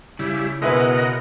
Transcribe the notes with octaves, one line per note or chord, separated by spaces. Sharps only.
C#3 G3 E4
B2 G#3 E4 A#4 B4 D#5 F#5